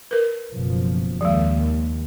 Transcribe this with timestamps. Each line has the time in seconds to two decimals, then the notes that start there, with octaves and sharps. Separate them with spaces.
0.11 A#4 B4
0.50 F#1 B2 F3
1.21 D#2 F3 G#3